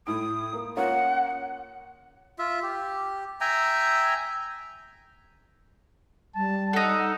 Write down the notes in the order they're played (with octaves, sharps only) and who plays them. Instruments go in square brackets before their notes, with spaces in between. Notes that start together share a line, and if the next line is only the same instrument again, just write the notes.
[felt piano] A2 E4 D7 [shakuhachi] D#6
[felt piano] A#3
[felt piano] A#3 C#4 F4 [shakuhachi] F#5
[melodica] F4 E5
G4
E5 G5 G#5 A#5
[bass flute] G3 [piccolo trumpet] A5
[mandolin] D#4 A4 [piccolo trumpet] F#5